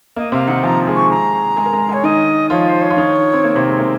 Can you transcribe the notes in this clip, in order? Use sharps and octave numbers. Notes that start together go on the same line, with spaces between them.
A#3 D#5
C3 C4 F5
D#3 D#4 F#5
F3 F4 A#5
G#3 G#4
C#6
A#5
G#3 G#4
A#4
G#3 G#4
G#3 G#4 C#5
D#3 D#4 D#5
F3 F4 C#5
C5
C#5
F4
D#3 D#4
C4
A#3
C3 C4
G#3
A#3